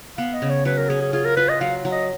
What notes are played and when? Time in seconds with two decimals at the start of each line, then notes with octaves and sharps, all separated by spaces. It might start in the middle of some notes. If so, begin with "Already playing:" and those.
0.18 B3 F5
0.34 D#5
0.42 C#3
0.50 C#5
0.65 F#3 B4
0.78 A#4
0.89 C#4 G#4
1.01 G#4
1.13 F4 G#4
1.25 A#4
1.36 F4 B4
1.49 D#5
1.61 F#3 F5
1.85 F#3
1.92 D#5